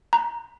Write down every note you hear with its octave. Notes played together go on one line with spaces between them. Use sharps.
A#5